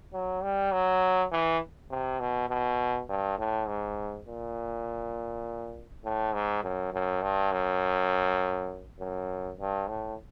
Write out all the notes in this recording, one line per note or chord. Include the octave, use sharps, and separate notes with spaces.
F#3
G3
F#3
E3
C3
B2
B2
G2
A2
G#2
A#2
A2
G#2
F#2
F#2
G2
F#2
F#2
G2
A2